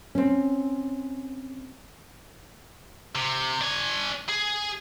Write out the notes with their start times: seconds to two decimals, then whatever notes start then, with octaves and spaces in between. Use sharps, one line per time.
0.15 C4 C#4
3.15 C3
3.61 D4 G#5
4.29 G#4